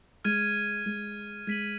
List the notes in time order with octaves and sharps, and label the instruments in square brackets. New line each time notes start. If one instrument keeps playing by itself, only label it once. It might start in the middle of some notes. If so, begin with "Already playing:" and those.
[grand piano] G#3 [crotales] F6 G#6 D#7
[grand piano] G#3
[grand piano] G#3 [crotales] G#6 B6 D#7 F#7